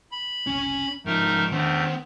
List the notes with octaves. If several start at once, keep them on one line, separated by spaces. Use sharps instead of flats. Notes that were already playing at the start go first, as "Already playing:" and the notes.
B5
F#1 C2 C#4 G#5
G1 G#2 F3 A3 D#4 A#4
E2 D#3 A3 B3 D4 C5